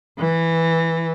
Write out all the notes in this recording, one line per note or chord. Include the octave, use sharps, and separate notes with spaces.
E3